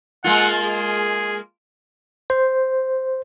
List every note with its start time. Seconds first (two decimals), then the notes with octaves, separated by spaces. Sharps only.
0.24 G#3 A#3 F4 F#5
0.63 G#4
2.30 C5